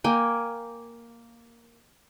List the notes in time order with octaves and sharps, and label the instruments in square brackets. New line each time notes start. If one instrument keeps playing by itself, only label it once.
[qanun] A#3 G5 G#5